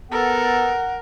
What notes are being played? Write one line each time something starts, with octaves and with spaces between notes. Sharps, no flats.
B3 A4 A#4 F#5